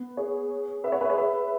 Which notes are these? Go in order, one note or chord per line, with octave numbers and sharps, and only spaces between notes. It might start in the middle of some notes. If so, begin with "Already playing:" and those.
Already playing: B3
G#4 C#5
B4 E5
C#5 F#5
B4 E5
G#4 C#5
B4 E5